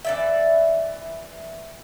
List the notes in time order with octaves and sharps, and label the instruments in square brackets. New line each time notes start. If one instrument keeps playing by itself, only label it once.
[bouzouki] E3 D5 E5